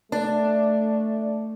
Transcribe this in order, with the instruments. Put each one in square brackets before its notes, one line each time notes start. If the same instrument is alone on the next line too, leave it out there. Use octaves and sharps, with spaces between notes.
[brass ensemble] A3 [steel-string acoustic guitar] D4